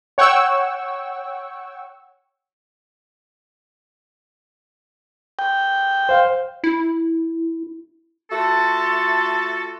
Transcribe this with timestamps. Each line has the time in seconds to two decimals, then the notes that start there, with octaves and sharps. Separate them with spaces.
0.18 C#5 F#5 G5 C#6 E6
5.39 G5
6.09 C5 F5
6.64 E4
8.31 A3 F4 F#4 A4